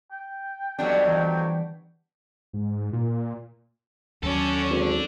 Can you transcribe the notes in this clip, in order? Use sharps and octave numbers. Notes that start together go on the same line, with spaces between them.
G5
F2 F#3 G3 B3 D4 G5
E3
G#2
A#2
D#2 F#3 C#4 A4 D5
G#1